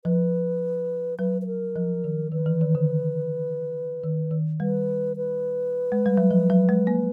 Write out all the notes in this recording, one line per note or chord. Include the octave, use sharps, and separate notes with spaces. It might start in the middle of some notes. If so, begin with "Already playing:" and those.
F3 B4
F#3 B4
B4
A#4
F3
D#3
D#3 B4
E3
D#3
D3
D#3
D#3
G3 B4
B4
G#3
G3
F#3
F3
F#3
G#3
A#3